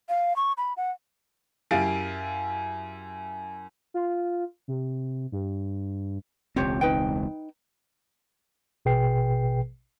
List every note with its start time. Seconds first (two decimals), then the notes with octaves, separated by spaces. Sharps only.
0.09 F5
0.36 C#6
0.58 B5
0.77 F#5
1.71 F#2 E4 G4 F5 A6 D7
3.94 F4
4.68 C3
5.32 G2
6.56 E1 C#2 C4 F4 G4 C#5
6.81 D#4 B4 G5
8.85 A1 B2 G#4 B4 G5 C7